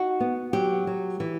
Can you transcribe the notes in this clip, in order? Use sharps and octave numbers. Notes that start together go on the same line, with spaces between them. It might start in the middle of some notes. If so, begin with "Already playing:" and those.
Already playing: D#4 F#4
B3
F#3 G4
F#3
E3